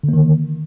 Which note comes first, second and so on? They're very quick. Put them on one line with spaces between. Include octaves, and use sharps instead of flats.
D3 A#3 D#3